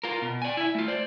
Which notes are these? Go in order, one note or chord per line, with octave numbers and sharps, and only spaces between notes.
F4 A#4
B2
D5 G#5
E4 E5
A3 F4
C5 D5